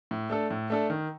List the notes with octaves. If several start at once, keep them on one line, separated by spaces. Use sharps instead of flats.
A2
A3 D4 A4
A2
A3 D4 A4
D#3